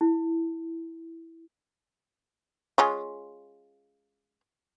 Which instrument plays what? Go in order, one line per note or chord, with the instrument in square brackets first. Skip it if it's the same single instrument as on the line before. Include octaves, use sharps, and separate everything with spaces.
[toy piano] E4
[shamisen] G#3 C#4 F4